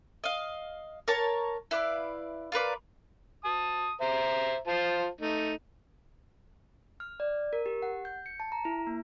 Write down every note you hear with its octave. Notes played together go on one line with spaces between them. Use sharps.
D#5 F5
A#4 C#5 A5
E4 B4 D5 F5
F4 A#4 B4 D5
A5 D#6
C5 E5 A#5
F4 C5 A5
A3 D#4
F6
D5
A#4
G4
F#5
G6
C#7
A5
A#5
E4
A#3